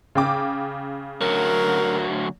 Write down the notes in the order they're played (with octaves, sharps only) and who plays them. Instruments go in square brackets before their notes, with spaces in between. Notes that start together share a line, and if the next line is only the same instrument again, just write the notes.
[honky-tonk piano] C#3 G5 D6
[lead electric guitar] D2 F#3 [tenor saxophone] A#4